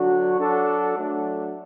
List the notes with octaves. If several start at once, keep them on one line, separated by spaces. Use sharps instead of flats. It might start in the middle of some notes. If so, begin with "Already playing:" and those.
Already playing: D3 F#3 D4 F#4
F#3 D4 F#4 A4
F#3 A3 D4